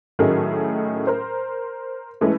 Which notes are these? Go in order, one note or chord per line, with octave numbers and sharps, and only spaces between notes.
A2 D#3 F#3 A3 C#4 G#4
A#4 C5
E3 G#3 A3 C#4